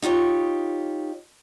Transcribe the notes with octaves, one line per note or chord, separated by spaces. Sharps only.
D#4 F4 G4 C#5